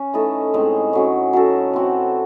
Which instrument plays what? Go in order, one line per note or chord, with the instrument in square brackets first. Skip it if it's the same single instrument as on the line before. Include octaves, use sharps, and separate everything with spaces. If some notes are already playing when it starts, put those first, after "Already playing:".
Already playing: [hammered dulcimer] C#4
E3 A3 D#4 A4
A2 G#3 C4
A2 F#3 C#4
F#3 C#4 F#4 A4
E3 C4 F#4